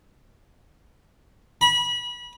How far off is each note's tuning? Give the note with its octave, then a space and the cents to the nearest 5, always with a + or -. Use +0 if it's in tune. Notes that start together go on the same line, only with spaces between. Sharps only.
B5 -30